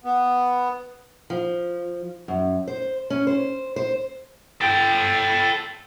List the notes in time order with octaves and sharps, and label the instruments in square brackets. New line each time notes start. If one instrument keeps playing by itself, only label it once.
[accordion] B3
[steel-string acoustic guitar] F3
F#2
C5
C#4
C5
C5
[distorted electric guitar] A4 G5